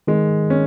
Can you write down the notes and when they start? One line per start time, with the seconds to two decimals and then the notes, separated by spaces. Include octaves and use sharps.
0.07 D#3 G#3
0.50 C#4